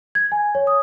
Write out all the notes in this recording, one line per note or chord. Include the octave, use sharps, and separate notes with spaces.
G#6
G#5
C#5
D#6